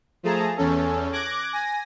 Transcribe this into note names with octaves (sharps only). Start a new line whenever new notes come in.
F3 A3 G#4 A5 A#5
E2 C#4 A4
D6 F#6 G#6 A#6
G#5 A#6